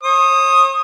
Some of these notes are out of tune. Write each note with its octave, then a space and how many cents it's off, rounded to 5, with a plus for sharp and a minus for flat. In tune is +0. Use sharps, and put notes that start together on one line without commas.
C#5 -45 D#6 +0